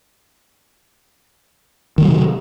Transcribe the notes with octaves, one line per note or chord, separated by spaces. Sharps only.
C3 D#3 F#3 A3